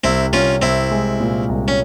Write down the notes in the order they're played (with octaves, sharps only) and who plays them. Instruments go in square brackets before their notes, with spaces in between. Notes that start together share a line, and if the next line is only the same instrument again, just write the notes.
[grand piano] C2 [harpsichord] C4 E4
[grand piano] C2 [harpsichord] C#4 F4
[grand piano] C2 [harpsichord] C4 E4
[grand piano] G#3
A#2
C2
[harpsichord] C#4